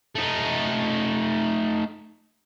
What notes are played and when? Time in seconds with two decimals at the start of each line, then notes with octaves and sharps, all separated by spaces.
0.15 A3 D#4